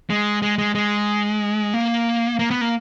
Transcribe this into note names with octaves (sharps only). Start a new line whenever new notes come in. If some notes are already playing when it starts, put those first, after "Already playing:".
G#3
G#3
G#3
G#3
A#3
A#3
B3
A#3